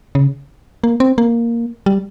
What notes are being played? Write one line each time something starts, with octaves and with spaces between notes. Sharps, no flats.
C#3
A#3
C4
A#3
G3